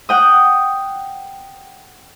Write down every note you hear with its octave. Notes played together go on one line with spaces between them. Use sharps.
F#5 G5 D#6